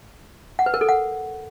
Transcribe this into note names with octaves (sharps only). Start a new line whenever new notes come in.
F#5
B4
A#4
A4
F#5